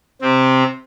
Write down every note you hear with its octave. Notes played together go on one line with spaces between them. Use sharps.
C3 C4